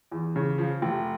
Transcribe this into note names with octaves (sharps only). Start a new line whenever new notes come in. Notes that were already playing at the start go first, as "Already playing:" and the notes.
E2
C#3
F3
F1